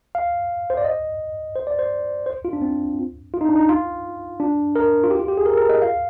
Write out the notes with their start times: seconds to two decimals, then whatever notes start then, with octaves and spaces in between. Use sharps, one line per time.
0.15 F5
0.70 C5
0.77 D5
0.85 D#5
1.55 C5
1.67 D5
1.79 C5
2.26 C5
2.45 F4
2.53 D4
2.62 C4
3.34 F4
3.41 D#4
3.49 D4
3.56 D#4
3.69 F4
4.40 D4
4.76 A#4
5.04 F4
5.10 G4
5.19 F4
5.28 G4
5.37 G#4
5.46 A#4
5.57 A#4
5.69 D#5
5.82 F5